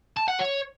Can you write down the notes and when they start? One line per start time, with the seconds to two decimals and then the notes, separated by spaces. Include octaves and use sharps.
0.17 A5
0.28 F#5
0.39 C#5